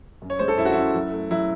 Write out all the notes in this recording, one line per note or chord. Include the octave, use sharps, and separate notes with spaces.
F#2
C#5
G#3 C5
A4
F#2 E4
F#4
F#2 E4
F#3
A3
F#3 E4